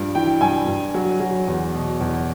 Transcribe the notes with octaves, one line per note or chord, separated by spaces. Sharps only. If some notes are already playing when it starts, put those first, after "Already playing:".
Already playing: G2 F3
E3 G5
G2 G#5
G2
F#3
F#3
E2
B2
E2